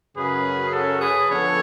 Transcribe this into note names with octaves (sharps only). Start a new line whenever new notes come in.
F#2 C#3 F#3 C#4 G#4 B4
F#4 A4
G#4 B4
D3 F3 B3 D4 A4 C#5